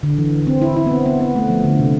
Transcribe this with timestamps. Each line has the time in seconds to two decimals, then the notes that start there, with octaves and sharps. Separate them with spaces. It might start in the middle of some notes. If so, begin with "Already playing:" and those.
0.03 D3
0.18 E3
0.47 C4
0.62 E4
0.76 E4
0.86 B3
0.92 C4
1.06 B3
1.21 B3
1.36 A3
1.50 F3
1.64 D3
1.79 C3